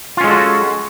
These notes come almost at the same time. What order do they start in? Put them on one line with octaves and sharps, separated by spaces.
F4 C#4 G#3 A4 F#4